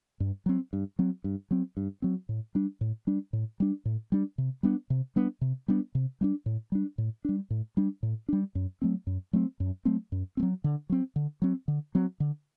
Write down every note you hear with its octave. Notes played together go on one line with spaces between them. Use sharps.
G2
F#3 C4
G2
F#3 C4
G2
F#3 C4
G2
F#3 C4
A2
G3 D4
A2
G3 D4
A2
G3 D4
A2
G3 D4
C3
G3 B3 D4
C3
G3 B3 D4
C3
G3 B3 D4
C3
G3 B3 D4
A2
G3 D4
A2
G3 D4
A2
G3 D4
A2
G3 D4
F#2
F#3 A3 C4
F#2
F#3 A3 C4
F#2
F#3 A3 C4
F#2
A3 C4
F#3
D3
F#3 C4
D3
F#3 C4
D3
F#3 C4
D3